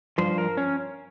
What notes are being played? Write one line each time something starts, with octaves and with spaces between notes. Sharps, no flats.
G2 F3 C5
A#4
C#4